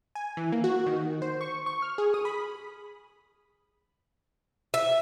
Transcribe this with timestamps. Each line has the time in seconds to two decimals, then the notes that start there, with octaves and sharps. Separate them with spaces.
0.15 G#5
0.37 E3
0.52 A#3
0.64 F#4
0.87 D#3
1.22 C5
1.41 C#6
1.66 C#6
1.82 F6
1.98 G#4
2.14 D#6
2.25 B5
4.74 E5